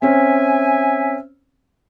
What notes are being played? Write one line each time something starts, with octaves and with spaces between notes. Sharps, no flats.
C4 C#4 E5 G#5